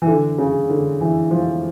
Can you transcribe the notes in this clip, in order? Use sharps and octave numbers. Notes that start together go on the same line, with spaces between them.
E3
D3
C#3
D3
E3
F3